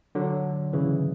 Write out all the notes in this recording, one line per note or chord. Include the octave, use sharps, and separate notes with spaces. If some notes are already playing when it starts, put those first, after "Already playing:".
D3 F#3
C#3 E3